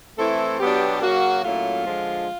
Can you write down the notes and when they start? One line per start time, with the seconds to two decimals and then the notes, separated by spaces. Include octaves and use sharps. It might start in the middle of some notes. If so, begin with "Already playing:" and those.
0.18 E3 A3 C4 E4 A4
0.60 B2 F#3 B3 D4 G4
1.01 C#3 F#3 A#3 F#4
1.43 A#2 F#3 A3 C#4 E4 F4
1.85 D3 F3 G#3